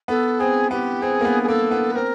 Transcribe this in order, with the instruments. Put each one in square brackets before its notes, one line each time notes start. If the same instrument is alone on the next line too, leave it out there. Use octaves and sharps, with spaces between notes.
[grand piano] B3 [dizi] A4
[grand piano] C4 [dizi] G#4
[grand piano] B3 [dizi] G4
[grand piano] C4 [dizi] G#4
[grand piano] A#3
B3
[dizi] G#4
[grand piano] A#3 [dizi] A4
[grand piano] B3
[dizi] B4
[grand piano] C4 [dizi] A#4